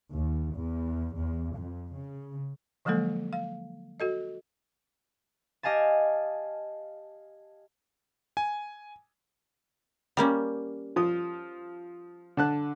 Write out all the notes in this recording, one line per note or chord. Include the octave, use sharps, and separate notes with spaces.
D#2
E2
E2
F2
C#3
D3 F3 F#3 G#3 A#3 A4
F5
F#4 A4 D#5
G4 D#5 F5 G#5 A5
G#5
G3 A#3 C#4
F3 F4 D#6
D3 A5 F#6